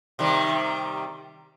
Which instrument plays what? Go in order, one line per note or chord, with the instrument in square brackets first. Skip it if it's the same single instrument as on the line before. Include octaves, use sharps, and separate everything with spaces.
[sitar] C3 D#3 G3